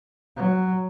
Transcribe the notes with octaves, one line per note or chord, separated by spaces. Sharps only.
F#3